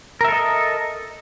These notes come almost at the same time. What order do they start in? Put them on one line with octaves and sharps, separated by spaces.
A#4 E5 A4 D#5